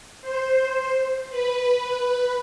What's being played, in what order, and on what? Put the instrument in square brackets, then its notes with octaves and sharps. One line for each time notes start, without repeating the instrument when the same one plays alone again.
[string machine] C5
B4